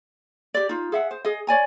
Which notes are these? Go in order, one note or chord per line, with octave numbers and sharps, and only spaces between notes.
G4 D5
D#4 F4
G#4 E5 F#5
C5
G#4 D#5
C#5 D5 G#5 A#5